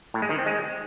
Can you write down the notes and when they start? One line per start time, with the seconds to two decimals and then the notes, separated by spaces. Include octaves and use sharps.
0.14 A2
0.22 G#3
0.30 D#3
0.38 C4
0.46 G#3